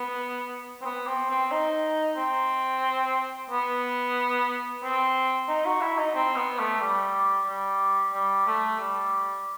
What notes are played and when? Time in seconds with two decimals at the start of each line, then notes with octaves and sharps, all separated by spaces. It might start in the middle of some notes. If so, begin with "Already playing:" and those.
Already playing: B3
0.81 C4
0.85 B3
1.07 C4
1.30 C4
1.51 D#4
2.17 C4
3.50 B3
4.83 C4
5.48 D#4
5.66 F#4
5.81 E4
5.98 D#4
6.15 C4
6.36 B3
6.59 A3
6.81 G3
7.47 G3
8.14 G3
8.47 A3
8.79 G3